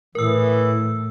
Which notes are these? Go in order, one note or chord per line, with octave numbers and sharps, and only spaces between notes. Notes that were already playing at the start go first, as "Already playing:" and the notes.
A2 E3 A#4 E6